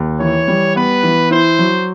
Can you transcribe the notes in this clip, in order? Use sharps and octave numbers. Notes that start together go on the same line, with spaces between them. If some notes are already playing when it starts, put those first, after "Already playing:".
Already playing: D#2
E3 C#5
G3
B3 B4
E3
E4 C5
F#3